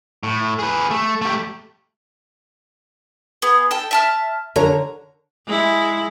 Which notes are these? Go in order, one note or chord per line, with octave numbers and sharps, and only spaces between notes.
A2
G#4 B4
A3
A3 G4
B3 G#4
A4 G5
E5 A5 F6
D3 A#4 C#5 A#5
G#3 E4